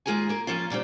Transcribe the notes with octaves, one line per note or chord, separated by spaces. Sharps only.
D#2 G#3 F4 G#4 A#4 G#5
A#3 A#4
F3 A#3 C#4 F4
A#2 C#3 G3 C4